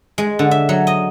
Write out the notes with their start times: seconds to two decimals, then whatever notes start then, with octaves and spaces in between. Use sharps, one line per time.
0.18 G#3
0.39 D3
0.51 E5
0.69 F#3
0.87 D#5